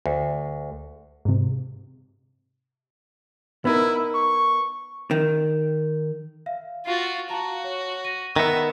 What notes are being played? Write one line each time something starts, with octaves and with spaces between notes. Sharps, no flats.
D2
G#2 C3
B3 D#4 E4 A#4
C#6
D#3
E5 F5
F4 F#4 A6 C7
F#4 F5 A5 A#5
C#5
A#6 D#7
D#3 B3 E5 F#6 A#6 B6